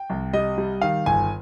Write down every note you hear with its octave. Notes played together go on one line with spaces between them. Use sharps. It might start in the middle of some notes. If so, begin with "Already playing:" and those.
Already playing: G5
C2
G3 D#5
G3
D#3 F5
G1 G#5